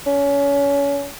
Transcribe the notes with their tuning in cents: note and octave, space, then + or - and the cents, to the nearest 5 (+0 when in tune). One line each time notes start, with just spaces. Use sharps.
C#4 +30